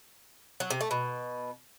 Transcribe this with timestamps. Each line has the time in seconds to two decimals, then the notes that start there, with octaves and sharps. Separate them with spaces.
0.60 F#3
0.70 C3
0.81 A3
0.91 B2